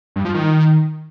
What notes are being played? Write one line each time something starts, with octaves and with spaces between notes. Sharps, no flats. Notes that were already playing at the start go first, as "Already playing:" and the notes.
G2
F3
D#3